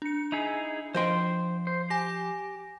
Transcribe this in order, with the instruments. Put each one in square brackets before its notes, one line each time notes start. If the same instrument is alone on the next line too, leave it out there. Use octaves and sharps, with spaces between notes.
[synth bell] D4 C#7
[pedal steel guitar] D#4 E4 G#4
[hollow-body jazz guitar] F3 D#5 G5 [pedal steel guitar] C5 C6
[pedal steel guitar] C5
[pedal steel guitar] G4 [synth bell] G#5 A#6